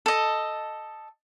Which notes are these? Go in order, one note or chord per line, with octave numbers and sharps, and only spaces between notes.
A4 D#5